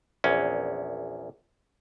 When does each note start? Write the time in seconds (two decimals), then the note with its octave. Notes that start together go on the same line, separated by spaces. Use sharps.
0.24 A#1 E2 C#4